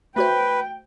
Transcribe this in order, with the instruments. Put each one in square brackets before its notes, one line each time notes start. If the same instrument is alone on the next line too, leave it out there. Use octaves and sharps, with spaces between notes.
[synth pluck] A3 F#4 C5 [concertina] B4 [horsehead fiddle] G5